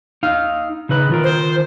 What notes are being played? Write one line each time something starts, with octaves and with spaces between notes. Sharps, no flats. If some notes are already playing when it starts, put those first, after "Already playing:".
D#4 F5
C#3 D#4 B4
D#3 F4 A#4
C5